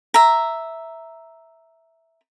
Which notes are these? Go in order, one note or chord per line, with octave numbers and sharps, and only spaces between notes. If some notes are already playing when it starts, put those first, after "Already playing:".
E5 A#5